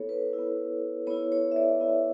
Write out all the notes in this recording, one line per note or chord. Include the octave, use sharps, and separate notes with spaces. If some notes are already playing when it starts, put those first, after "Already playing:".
Already playing: B3 E4 A4 C#5
B4
E4
B3
B3 E4 C#5
C#5
E5
D5
B3 E4